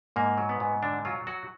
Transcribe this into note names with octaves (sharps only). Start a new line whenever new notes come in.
G#2 A#3
F#3
B3
G#2
D3 D4
F#3 F4
F#3 F#4